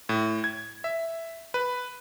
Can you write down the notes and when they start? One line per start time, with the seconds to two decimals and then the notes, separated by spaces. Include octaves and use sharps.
0.09 A2
0.44 G#6
0.84 E5
1.54 B4